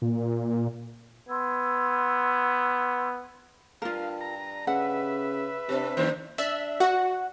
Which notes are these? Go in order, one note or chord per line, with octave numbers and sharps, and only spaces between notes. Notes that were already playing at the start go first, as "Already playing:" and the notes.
A#2
B3 C6 E6 G#6
G2 F4 A#4 F5
A#5
C#3 B4 E5 F#5
C3 C4 D4
F#1 D#3 D4 C5
D4 E5
F#4 F#5